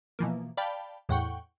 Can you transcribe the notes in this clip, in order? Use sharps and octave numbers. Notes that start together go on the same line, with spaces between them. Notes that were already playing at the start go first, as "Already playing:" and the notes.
B2 E3 F3 A#3
D5 F5 G5 A5 B5
E2 A2 F#5 G5 C#6